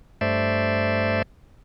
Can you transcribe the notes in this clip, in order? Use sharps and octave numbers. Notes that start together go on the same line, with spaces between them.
G2 A3 C5 D5 E5